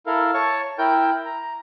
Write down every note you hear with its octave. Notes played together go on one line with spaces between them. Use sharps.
E4 A4 A#4 F5
C#5 A5 C#6
E4 A#4 G5 G6
A#5